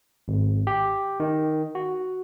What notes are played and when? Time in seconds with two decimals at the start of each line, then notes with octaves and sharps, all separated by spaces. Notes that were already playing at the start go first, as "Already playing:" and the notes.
0.28 G#1
0.67 G4
1.20 D#3
1.75 F#4